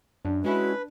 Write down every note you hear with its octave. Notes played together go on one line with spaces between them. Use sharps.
F#2 D4
G#3 C#4 E4 F#4 B4